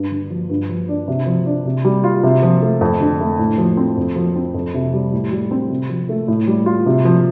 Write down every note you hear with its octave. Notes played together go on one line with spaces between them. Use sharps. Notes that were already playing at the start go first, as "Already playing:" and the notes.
Already playing: G2
D3
F3
G2
F3
D4
C3
F3
D4
C3
G3
F4
C3
F3
A3
F2
D3
A3
A2
F3
C4
F2
F3
C4
F2
C3
G3
A2
G3
C4
C3
F3
A3
A2
G3
F4
C3
F3